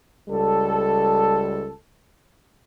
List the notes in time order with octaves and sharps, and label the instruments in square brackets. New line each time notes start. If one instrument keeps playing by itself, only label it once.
[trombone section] C#2 G3 A4